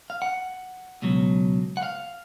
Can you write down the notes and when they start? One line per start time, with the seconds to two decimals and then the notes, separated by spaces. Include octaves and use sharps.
0.10 F5
0.22 F#5
1.02 C#2 B2 F#3
1.77 F#5
1.83 F5